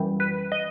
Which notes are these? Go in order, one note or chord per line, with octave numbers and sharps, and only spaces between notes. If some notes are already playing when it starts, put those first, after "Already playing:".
Already playing: F#2 E3 G3
B4
D#5